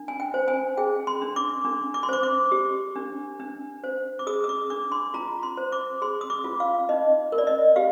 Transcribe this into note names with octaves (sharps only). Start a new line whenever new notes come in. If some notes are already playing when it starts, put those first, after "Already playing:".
Already playing: D4
G#5
G5
C5
G#5
G#4 G5
C6
D4
D6
D4
D6
C6
C5 D6
D6
G4
D4
D4
C5
D6
G#4 D#6
D#6
D6
D4 D6
C6
F4 A#5
C6
C5
D6
G#4 C6
D#6
D6
F4
F5
D#4 D#5
A#4
D5
D#5
G4 F5